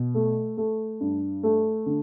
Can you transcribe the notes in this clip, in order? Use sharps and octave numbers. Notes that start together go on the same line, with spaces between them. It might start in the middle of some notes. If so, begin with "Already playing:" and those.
Already playing: B2
A3
A3
G2
A3
D3